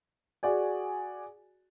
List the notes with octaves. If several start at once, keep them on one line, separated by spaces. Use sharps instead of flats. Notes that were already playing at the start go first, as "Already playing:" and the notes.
F#4 G#4 D5 G#5